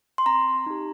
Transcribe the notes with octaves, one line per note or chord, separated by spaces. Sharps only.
C6
C4 A#5
D#4 G4